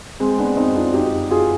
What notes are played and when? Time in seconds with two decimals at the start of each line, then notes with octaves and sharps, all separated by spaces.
0.20 G#3 C4
0.38 B3 D4
0.57 C4 D#4
0.75 D4 F4
0.94 D#4 G4
1.31 F4 G#4